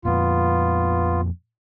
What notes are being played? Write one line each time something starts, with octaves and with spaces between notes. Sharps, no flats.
F2 A#2 B3 F4